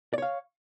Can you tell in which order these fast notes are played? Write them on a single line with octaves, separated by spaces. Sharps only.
D5 C#5 F5